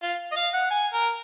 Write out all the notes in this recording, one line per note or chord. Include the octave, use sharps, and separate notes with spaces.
F4
D#5
F5
F#5
G#5
A#4